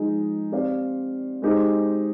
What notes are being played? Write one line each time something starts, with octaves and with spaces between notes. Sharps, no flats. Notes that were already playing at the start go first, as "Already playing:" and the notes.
Already playing: F3 G#3 D#4 G#4
C4 G4 D5 F5
G#3 D#4 G4 C5